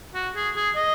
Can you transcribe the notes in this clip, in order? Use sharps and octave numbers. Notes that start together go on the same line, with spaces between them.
F#4
G#4
G#4
D#5